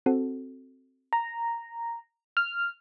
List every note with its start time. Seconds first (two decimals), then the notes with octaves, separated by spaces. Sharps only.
0.06 C4 F#4 A4
1.13 A#5
2.37 F6